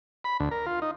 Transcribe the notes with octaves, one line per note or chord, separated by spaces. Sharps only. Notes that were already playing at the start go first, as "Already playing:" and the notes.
B5
D2
A#4
F4
D#4